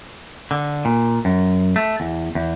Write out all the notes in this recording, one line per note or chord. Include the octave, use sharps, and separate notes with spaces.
D3
A#2
F#2
A3
E2
E2